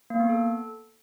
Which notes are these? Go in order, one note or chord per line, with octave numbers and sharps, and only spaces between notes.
A#3
B3
A4